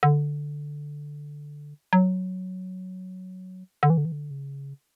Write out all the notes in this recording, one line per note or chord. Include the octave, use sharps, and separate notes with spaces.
D3
F#3
D3
E3
D3
E3
D3
C#3